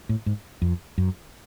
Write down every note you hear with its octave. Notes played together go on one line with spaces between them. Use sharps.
A2
G#2
F2
F#2